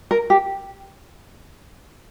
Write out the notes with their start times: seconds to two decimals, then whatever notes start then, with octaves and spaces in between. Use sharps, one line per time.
0.11 A#4
0.30 G4